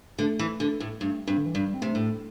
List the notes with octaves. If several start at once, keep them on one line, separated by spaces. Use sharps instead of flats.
D3 A3
E3
D3
A2
G2 A3
G2 C4
D3
E3
G2 G3
C4
C3 A3
A2